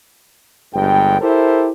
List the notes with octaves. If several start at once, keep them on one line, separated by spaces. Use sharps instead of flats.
G1 G2 G#3 G5
E4 G4 A4 A#4 C5